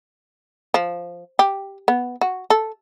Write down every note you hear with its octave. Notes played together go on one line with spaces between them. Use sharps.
F3
G4
B3
F#4
A4